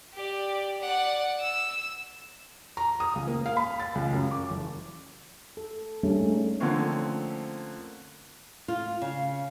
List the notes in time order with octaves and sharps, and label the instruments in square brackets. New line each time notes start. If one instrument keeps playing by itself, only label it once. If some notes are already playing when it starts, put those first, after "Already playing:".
[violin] G4 D5
D5 F#5
E6
[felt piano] A#5
D#6
C#2
A#3
F5
B5
A6
C#2
F#2
D6
F#1
[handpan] A4
G3 A3 A#3 C#4 D4 G#4
D#4
[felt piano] D3 F3 A3 A#3 C4 C#4
[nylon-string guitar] F4
C#3